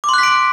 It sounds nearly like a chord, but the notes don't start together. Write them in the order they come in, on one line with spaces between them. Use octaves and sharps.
D6 C6 F#6 B6 D7